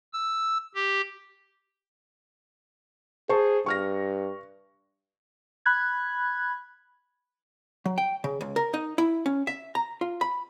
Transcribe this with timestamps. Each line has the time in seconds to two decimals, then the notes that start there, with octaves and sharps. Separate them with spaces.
0.13 E6
0.74 G4
3.29 G#4 C5 A5 C#6
3.66 G2 C#6 F6 A#6
5.66 B5 F#6 G#6
7.86 F#3
7.98 G5
8.24 C#3
8.41 C#2
8.56 A#4
8.74 D#4
8.98 E4
9.26 C#4
9.47 E5
9.75 A#5
10.01 F4
10.21 B5